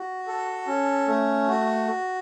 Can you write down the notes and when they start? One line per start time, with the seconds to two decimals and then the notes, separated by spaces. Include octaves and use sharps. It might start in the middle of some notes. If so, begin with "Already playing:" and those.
Already playing: F#4
0.27 A4
0.67 C#4
1.08 A3
1.48 F#4